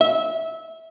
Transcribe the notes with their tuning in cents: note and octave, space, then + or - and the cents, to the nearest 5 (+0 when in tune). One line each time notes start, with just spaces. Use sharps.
E5 -20